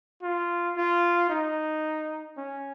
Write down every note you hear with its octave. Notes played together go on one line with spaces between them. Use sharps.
F4
F4
D#4
C#4